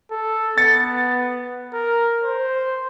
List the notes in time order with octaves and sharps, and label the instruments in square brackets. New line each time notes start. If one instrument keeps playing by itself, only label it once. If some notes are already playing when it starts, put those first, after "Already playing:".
[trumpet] A4
[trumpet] B3 [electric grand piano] A6 C#7
[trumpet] A#4
C5